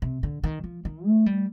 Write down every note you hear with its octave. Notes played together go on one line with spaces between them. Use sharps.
C3
D3
D#3
F3
D#3
A3
G3